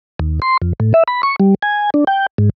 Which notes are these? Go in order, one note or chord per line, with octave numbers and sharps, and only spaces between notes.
D#2
C6
F2
A2
E5
B5
C#6
G3
G#5
D4
G5
G#2